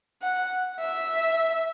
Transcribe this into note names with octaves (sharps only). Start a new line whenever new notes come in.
F#5
E5